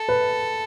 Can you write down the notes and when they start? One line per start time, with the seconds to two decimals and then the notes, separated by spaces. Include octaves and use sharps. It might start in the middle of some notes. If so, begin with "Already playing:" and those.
Already playing: A4
0.09 B4